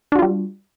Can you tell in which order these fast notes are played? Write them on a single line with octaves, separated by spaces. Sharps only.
D4 F#4 F4 G3